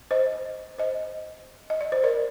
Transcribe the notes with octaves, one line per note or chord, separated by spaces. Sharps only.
C5 D#5
C5 D#5
D#5
D5
C5
A#4 D5